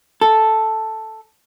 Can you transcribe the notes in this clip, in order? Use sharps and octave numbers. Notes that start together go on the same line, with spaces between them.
A4